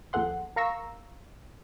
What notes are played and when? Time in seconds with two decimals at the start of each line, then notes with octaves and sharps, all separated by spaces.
0.13 D#2 F3 G#4 A4 F#5 C6
0.56 A#4 F5 A#5 C#6 E6